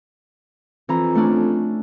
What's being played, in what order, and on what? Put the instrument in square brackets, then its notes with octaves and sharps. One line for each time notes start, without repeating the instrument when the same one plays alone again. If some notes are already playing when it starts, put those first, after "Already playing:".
[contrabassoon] F2 [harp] E3 A#5
[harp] A3 C#4 D4